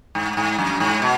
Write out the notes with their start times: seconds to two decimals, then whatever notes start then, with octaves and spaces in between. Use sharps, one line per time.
0.15 G#2
0.37 G#2
0.58 F#2
0.80 G#2
1.02 B2